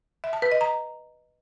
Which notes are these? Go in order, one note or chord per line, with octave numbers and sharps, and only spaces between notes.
E5
A5
B4
D#5
A#5